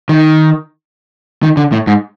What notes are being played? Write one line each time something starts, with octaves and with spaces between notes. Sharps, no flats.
D#3
D#3
D3
A2
G#2